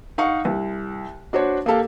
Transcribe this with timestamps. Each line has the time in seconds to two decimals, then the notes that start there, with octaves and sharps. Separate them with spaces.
0.18 D#4 F5 F#5 C#6
0.45 C2
1.33 D4 F#4 C5 C#5
1.66 A#3 G4 A4 F5